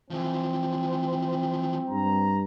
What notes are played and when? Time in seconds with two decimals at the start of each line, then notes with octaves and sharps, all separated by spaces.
0.10 E3 F3 C4
1.90 G2 A#5